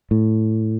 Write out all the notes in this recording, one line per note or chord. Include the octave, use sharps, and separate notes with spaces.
A2